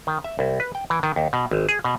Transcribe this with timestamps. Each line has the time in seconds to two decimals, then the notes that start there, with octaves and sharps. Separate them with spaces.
0.07 D#3
0.24 E5
0.39 C2
0.60 B4
0.75 G5
0.90 E3
1.03 D#3
1.16 D#2
1.33 B2
1.51 G#1
1.69 G#4
1.84 B2